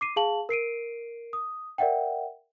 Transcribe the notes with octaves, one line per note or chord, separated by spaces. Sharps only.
D6 C7 D#7
G#4 F5 A5 F#7
A#4 C7 D7 D#7
D#6
A#4 D5 E5 F#5 G5